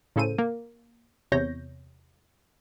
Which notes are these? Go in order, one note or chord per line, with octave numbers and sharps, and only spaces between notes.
A2 C#3 A4 C5 D#7
A#3
E2 C3 C#5 G6 A#6